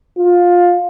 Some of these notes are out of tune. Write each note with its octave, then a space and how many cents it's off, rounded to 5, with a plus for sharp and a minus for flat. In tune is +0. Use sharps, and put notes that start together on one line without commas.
F4 +15